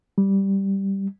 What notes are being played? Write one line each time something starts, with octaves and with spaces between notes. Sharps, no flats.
G3